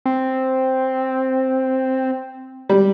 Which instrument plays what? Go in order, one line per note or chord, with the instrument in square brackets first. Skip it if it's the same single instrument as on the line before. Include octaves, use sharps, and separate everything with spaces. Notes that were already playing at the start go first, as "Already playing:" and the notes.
[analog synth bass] C4
[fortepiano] G3